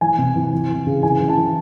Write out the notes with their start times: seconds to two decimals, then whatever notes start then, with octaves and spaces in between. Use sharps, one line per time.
0.01 E3 G#5
0.18 C3
0.36 E3
0.53 E3
0.69 E3
0.87 C#3
1.03 E3 G#5
1.20 E3
1.28 A5
1.37 E3